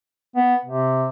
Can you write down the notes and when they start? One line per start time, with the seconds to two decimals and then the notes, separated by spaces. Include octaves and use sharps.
0.36 B3
0.65 C3